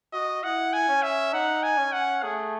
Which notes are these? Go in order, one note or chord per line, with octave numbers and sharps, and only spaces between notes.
F#4 D#5
E4 F#5
G#5
C#4
E5
D#4 F#5
G#5
C#4
F#5
A3 G#4